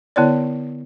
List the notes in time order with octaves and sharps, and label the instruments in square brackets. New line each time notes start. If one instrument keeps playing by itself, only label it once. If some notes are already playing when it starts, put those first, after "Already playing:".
[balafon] D3 B3 E4 C#5 D5